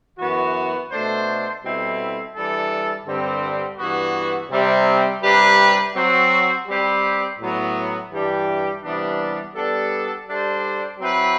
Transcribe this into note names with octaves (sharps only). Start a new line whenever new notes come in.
F#2 E3 B3 F#4
B2 A3 D4 A4 C5
B2 G3 C4 E4 A4
E3 G3 D4 A4
G2 D3 G3 C4
G2 E3 B3 F#4
C3 G3 C4
C3 G3 D4 G4 B4
F#3 C4 F#4
G3 C4 G4 B4
A2 F#3 B3
G2 E3 G3 D4 G4
C3 E3 G3 B3 D4
G3 B3 D4 A4
G3 D4 A4 C5
F#3 C4 E4 B4